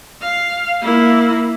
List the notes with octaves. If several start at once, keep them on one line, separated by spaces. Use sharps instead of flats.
F5
A#3 E4